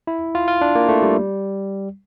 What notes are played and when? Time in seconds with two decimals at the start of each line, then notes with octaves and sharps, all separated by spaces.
0.07 E4
0.35 F4
0.48 F4
0.61 D4
0.75 A#3
0.89 A3
1.02 G3